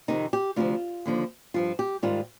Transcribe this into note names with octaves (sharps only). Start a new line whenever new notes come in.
F2 C3 D#3 D#4
G4
D2 C3 F3 F4
D#2 D3 F3
G2 F3 F4
G4
G#2 D#3 G3 F4